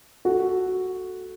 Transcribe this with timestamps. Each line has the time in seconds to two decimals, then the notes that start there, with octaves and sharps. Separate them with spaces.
0.25 F#4 A4